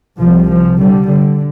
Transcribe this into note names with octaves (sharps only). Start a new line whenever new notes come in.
C2 C3 F3
F3
D3 G3
D3